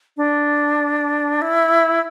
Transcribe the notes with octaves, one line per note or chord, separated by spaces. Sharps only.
D4
E4